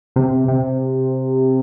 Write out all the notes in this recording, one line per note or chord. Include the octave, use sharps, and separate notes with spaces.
C3
C3